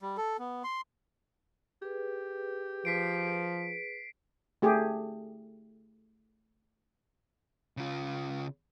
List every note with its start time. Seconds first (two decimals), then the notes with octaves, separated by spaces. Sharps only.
0.02 G3
0.17 A4
0.39 B3
0.64 C6
1.82 G4 G#4 B4
2.85 F3 B6 C7 D7
4.62 A3 G4 G#4
7.77 C#3 F4